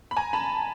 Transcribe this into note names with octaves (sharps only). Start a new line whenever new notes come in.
B5
G#5 A#5
A5 B5